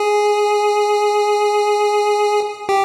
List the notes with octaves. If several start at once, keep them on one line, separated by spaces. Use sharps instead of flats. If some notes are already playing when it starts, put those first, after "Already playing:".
Already playing: G#4
G4